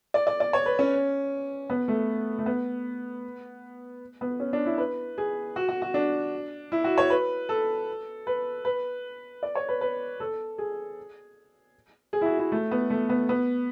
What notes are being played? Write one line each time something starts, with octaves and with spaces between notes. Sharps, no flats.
D5
D5
D5
C#5
B4
C#4
B3
A3
A3
B3
B3
C#4
D4
E4
B4
G#4
F#4
F#4
F#4
D4
E4
F#4
C#5
B4
A4
B4
B4
D5
C#5
B4
B4
A4
G#4
G#4
E4
F#4
E4
A3
B3
A3
B3
B3